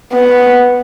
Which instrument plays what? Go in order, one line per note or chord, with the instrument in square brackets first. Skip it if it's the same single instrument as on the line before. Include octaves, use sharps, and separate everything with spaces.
[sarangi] B3